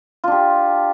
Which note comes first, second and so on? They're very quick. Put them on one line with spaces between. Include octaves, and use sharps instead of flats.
F4 D4 G4